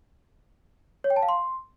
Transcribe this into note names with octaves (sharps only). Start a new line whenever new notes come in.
C#5
G5
A5
F5
C6